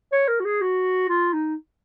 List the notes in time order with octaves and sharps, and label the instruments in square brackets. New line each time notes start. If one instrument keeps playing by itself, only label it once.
[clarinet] C#5
A#4
F#4
G#4
F#4
F4
D#4